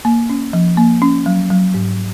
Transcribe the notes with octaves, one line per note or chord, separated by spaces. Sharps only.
A#3
C#4
F3
A#3
C#4
F#3
F#3
G#2